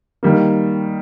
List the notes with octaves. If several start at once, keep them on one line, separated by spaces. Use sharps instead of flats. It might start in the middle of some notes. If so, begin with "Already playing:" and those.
D#3 G3 A#3